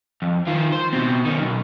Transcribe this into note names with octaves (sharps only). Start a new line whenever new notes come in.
F2
D#3 F4
C5
B2 C4
D#3 C#4
B1